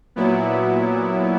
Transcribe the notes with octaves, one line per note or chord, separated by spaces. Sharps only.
A#2 F#3 B3 E4